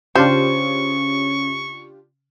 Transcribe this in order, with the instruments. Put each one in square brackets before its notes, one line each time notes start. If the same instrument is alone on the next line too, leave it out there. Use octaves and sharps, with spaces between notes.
[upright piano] C#3 [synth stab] D4 F4 G4 [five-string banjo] C5 [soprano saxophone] C#6